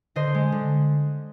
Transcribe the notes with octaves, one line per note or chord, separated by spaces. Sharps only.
D3 C5 D#5
G#3
D3